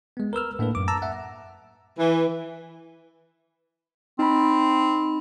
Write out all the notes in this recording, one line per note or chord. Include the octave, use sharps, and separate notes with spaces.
G#3 B3
A#4 B4 E6 F6
A2 A#3 D4 A4 B4
F#2 D6
A5 A#5 E6
E5 F#5
E3
C4 D#4 B5